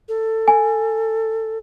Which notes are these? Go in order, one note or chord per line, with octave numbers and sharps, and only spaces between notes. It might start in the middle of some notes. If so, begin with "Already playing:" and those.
A4
G#5